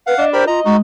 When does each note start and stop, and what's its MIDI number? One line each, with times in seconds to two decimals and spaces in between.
0.07 0.14 71
0.07 0.25 77
0.07 0.25 78
0.18 0.47 62
0.18 0.28 75
0.33 0.44 67
0.33 0.44 70
0.33 0.45 72
0.33 0.44 83
0.47 0.60 65
0.47 0.78 75
0.47 0.60 82
0.65 0.80 56
0.65 0.77 63
0.65 0.77 66